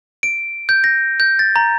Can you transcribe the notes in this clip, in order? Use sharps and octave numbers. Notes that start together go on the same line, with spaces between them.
D7
G6
A#6
G6
A6
A#5